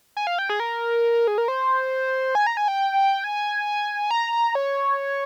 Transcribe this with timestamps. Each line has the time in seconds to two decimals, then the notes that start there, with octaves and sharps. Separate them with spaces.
0.17 G#5
0.27 F5
0.39 G5
0.49 G#4
0.60 A#4
1.27 G#4
1.38 A#4
1.48 C5
2.35 G#5
2.47 A#5
2.57 G#5
2.68 G5
3.24 G#5
4.11 A#5
4.33 A#5
4.55 C#5